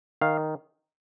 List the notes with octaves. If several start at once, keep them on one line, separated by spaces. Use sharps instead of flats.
D#3 F5